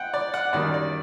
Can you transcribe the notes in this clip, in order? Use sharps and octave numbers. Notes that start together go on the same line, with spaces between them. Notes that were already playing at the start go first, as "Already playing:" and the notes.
Already playing: F#5 G5
D5
F#5
F#2 D#3 G3 A#3 D5
D5